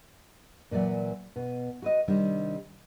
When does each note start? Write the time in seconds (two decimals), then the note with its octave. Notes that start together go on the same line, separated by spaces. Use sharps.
0.71 A#2 E3 F#3 D5 E5
1.36 B2
1.82 F#4 B4 D#5
2.08 C3 D#3 G3 D4